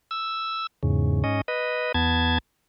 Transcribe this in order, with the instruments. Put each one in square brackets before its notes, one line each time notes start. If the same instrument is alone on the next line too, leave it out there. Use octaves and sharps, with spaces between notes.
[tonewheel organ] E6
E2 G#2 C#3
G#2 C#4 D#5
B4 D#5
E2 B3 A5 G#6